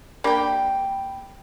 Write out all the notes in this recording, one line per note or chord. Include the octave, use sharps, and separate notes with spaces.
A#3 D4 G4 G5 B5